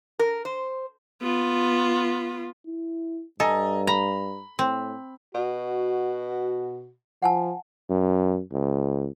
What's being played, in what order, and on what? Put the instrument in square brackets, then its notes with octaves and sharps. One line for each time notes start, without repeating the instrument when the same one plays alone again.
[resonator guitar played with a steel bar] A#4
C5
[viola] B3 F4
[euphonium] E4
[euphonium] G2 [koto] A4 [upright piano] D#5 G#5 A#5
[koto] A#5 [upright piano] B5
[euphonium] A2 [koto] C4
[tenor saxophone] B2 [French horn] F#4
[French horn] F3 [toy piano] F#5 G#5 A5
[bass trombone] F#2
C#2